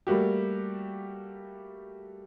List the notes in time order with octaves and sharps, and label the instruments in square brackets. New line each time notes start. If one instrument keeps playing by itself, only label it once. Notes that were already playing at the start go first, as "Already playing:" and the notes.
[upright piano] G3 A3 A#3 F#4 G4